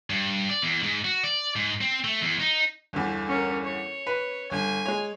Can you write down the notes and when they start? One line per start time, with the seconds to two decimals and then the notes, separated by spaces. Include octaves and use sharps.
0.10 G2
0.50 D5
0.63 E2
0.83 G#2
1.04 F#4
1.23 D5
1.56 G#2
1.81 C4
2.04 A3
2.21 E2
2.40 D#4
2.93 G1 E2
3.28 C#4 A#4
3.64 C#5
4.07 B4
4.52 G1 G#5
4.86 G#3 C#5